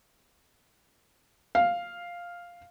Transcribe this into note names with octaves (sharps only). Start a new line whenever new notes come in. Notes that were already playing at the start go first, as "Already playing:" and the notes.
F5